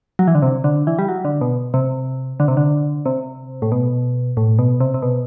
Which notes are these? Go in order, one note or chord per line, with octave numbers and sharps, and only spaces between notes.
F#3
E3
D3
C3
D3
E3
G3
F#3
D3
B2
C3
D3
C3
D3
C3
A2
B2
A2
B2
C3
C3
B2